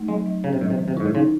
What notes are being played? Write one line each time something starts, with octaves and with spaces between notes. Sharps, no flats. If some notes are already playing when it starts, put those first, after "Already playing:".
Already playing: A3 D#4
F#3 G#3
F#3
C#3 C#4
C3
A2 F#3
C3
D#3
C3
G#2 E4
A2
C#3 D#4